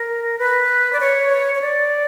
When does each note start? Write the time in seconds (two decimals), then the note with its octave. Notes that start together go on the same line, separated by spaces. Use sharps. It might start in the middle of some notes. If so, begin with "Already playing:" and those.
Already playing: A#4
0.39 B4
0.93 D5
1.00 C#5
1.55 C#5
1.62 D5